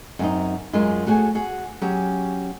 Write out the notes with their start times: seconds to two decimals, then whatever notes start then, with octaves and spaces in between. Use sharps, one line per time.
0.19 F#2 C4 C#4 D#4
0.73 F#2 G#3 F4
1.06 A3 F#4 G#4 C#5 G#5
1.35 F#4 G#4 F#5
1.82 F#3 C#4 G4 G#4